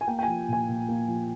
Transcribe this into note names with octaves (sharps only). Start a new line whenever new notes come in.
G#5
A#3 G5
G5
G#5
F3
A#2 G#5
A#2
A#3
F3